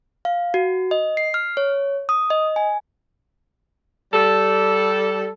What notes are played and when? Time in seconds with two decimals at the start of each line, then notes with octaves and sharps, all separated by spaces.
0.25 F5
0.54 F#4
0.91 D#5
1.17 C7
1.34 F6
1.57 C#5
2.09 D#6
2.30 D#5
2.56 G#5
4.13 G3 A4